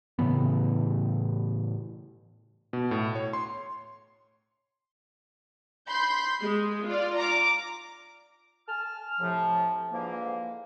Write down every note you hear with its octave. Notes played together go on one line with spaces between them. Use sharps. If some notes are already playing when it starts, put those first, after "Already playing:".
A2 C#3 E3 B3
B2
A2
C#5
C6
B5 C6 G6
G#3
F4 D5
A#5 D6
G#5 A5 F6
A2 C3 F3
G#2 D3 E3 F3 A#3